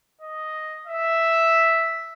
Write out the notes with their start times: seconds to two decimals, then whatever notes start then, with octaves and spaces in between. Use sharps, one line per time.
0.21 D#5
0.86 E5